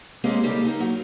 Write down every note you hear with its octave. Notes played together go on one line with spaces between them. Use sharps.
G#3 A#3 C4 C#4 G4 G#4
C#3 G3 A#3 D#4 G4 A4
A#3 D#4
F#3